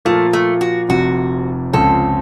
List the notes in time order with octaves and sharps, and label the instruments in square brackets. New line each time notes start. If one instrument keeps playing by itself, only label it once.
[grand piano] A#2 F3 A#3 F4 [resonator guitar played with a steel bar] A3
[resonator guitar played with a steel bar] A3
F#4
[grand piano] F1 F2 C3 [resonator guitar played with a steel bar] F#4
[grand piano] C#2 C#3 F3 C4 [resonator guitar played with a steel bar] A4